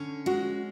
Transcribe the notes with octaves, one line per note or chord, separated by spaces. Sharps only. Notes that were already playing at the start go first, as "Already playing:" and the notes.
Already playing: D3 C#4
G#3 F#4